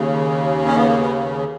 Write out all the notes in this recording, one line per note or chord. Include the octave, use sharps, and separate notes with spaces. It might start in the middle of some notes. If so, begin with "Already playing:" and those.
Already playing: D#2 C#3
C#4
B3
A#3
B3